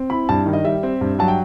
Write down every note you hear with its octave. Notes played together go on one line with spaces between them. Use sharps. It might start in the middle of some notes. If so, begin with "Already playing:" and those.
Already playing: C4
E4 B5
G2 A5
D#3
D#5
G3 E5
C4
G2
F#3 A5
G5